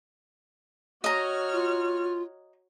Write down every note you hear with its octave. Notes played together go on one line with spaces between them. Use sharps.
F#4 C#5 D#5 A#5 F6
F4